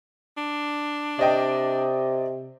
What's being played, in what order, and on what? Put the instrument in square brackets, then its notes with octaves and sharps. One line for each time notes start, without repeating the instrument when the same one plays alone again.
[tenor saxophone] D4
[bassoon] C3 [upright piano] D5 D#5 G5